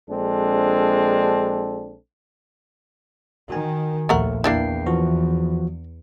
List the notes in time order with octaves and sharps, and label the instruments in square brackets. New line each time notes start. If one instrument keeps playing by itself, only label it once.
[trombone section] A#1 G#3 C4 D4 A4
[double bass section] D#3 [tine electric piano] F#4 G#5
[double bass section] A#1 D#2 [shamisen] A3 A#4 F#5
[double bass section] E2 [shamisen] A#3 D4 E4 [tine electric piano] G5 C7
[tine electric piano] E3 F3 F#4